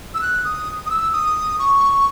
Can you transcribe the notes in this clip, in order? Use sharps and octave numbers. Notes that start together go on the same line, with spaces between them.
E6
F#6
D#6
D#6
E6
D#6
C#6